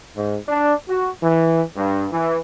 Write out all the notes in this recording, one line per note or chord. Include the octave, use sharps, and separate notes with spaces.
G#2
D4
F#4
E3
G2
E3